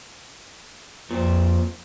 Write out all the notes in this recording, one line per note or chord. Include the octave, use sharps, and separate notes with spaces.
F2 A#2 C4